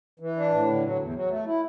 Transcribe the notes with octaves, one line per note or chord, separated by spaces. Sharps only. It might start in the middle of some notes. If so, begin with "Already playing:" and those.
E3
D4
A2
D3
F#3
E2
F#3
A3
E4